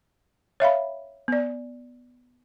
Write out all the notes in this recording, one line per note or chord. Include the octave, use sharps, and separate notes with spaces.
C#5 E5 F5 B5
B3 D5